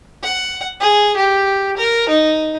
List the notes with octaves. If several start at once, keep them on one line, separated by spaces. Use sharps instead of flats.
F#5
G#4
G4
A#4
D#4